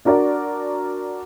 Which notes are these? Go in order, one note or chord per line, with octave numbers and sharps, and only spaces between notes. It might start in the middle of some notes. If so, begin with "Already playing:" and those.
D4 F#4 A#4 D5